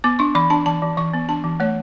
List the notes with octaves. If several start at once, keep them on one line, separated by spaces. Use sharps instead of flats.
B3 D6
D4 C#6
E3 B5
D4 A5
E3 A5
E3
E3 C#6
B3
D4 A5
E3
A3 C#5